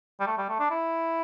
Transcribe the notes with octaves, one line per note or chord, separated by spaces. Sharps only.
G3
A3
G3
A3
D4
E4